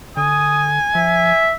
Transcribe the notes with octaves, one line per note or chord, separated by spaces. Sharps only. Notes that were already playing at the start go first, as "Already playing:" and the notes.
D3 G#5 D#6
F3 E5